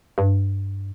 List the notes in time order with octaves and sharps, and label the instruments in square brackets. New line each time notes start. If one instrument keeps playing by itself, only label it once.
[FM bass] G2